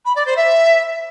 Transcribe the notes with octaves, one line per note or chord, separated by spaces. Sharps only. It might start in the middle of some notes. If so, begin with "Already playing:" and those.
B5
D5
C5
E5